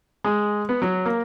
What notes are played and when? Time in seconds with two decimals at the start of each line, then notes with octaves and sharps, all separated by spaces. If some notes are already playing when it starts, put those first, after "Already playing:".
0.24 G#3
0.69 B3
0.82 F#3
1.05 A#3